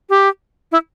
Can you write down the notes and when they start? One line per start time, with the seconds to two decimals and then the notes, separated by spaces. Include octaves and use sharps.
0.10 G4
0.72 E4